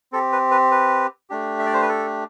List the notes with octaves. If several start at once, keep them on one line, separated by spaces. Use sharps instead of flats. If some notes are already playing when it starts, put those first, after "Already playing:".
C4 G4 A4
B4
B4
B4
A3 D4 G4
E5
D5
C5
B4
A4